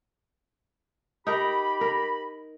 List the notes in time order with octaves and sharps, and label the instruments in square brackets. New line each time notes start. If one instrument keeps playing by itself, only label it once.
[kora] D#4 A#4 [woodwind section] G4 B5
[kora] A#4